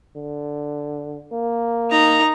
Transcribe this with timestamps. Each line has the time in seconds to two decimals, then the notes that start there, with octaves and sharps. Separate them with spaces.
0.16 D3
1.32 A#3
1.91 D#4 A#5